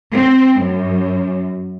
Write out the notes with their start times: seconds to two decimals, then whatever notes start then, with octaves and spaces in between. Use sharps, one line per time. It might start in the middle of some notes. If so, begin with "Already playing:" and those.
0.13 C4
0.60 F#2